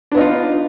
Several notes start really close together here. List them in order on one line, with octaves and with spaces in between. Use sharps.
D4 B3 D#4 F4